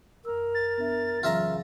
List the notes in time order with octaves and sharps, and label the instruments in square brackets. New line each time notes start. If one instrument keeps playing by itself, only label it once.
[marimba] F#2 E6 [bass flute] A#4
[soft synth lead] A6
[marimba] B3 D4 E5
[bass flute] C#3 [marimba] E3 F#3 [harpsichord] F4 E5 A#5